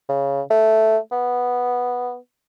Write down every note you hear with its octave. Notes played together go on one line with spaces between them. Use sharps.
C#3
A3
B3